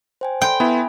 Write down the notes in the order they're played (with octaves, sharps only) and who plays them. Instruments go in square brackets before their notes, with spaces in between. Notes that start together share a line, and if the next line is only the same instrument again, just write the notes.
[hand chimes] C5 G5 G#5
[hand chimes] A4 B5 C6 [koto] G5
[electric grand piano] B3 E4 [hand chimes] E5 G#5 B5